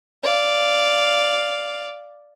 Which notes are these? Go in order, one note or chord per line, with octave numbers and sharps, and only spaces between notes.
D5 F5